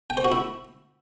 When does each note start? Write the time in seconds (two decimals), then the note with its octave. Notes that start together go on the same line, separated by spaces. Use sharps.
0.10 G5
0.17 C5
0.24 F#4
0.32 E4